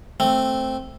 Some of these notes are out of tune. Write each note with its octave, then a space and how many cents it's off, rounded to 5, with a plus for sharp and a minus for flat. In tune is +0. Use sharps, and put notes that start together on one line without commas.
A3 +0 C4 +0